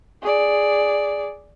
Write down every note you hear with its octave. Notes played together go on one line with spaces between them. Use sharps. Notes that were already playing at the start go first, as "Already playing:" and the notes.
G#4 D5